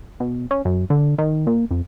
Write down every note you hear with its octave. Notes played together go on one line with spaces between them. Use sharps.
B2
C#4
F#2
D3
D#3
A#2
F2